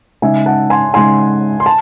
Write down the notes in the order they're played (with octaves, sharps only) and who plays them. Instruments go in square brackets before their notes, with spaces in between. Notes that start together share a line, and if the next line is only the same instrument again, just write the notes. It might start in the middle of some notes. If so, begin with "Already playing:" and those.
[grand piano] C#3 G#3 D#4 [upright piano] E5 G#5
[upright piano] F#5 A5
G#5 C6
[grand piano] C#3 G#3 D#4 [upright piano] G#5 C6
[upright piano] C6
A5